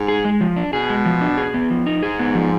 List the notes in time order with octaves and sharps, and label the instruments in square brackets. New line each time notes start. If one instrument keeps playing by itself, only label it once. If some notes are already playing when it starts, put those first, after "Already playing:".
Already playing: [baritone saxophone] G#2
[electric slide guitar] G#4
G#3
F3
D4
[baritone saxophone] B2 [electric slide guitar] G#4
[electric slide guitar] G#3
F3
D4
G#4
B3
F3
D#4
[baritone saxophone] G#2 [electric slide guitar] G#4
[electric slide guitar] B3
F3